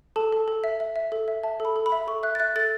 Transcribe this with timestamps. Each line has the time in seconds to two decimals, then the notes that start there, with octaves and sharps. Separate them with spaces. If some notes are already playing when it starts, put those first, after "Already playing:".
0.16 A4 A5
0.32 A4
0.48 A4
0.64 E5
0.80 E5
0.96 E5
1.12 A4
1.28 E5
1.43 E5 A5
1.60 A4
1.65 B5
1.76 A4
1.86 B5
1.92 E5
2.07 A4 C#6
2.23 E5 F#6
2.35 A6
2.40 E5 F#6
2.56 A4 A6